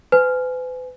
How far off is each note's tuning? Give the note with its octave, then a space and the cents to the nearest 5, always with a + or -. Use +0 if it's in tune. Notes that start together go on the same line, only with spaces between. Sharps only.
B4 +40 G#5 +10